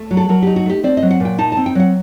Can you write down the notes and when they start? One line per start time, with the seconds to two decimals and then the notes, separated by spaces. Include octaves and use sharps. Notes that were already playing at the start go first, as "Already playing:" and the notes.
Already playing: A3
0.11 F#3
0.17 A4
0.29 F#3 A#4
0.43 D#4 G4
0.56 F#4
0.66 A3 G4
0.84 C4 D5
0.97 D#5
1.02 F#3
1.11 F#5
1.20 A#2
1.25 G5
1.38 D#4 A5
1.52 A5
1.57 C4
1.66 G5
1.75 F#3 F#5